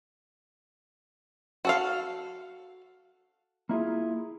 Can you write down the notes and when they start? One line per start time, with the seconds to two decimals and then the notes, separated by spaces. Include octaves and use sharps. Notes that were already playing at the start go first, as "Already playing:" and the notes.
1.65 F#4 A4 F5
3.69 A#3 E4 F4 G#4